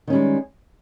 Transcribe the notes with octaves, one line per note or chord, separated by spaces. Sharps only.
D#3 G3 G#3 C#4